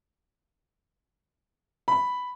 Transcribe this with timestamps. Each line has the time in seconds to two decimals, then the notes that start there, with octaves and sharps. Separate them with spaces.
1.88 B5